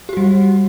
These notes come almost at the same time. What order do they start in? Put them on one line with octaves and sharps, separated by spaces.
G4 F#4 G3